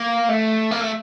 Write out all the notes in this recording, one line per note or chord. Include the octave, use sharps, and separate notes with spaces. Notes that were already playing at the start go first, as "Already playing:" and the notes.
Already playing: A#3
A3
A#3
A3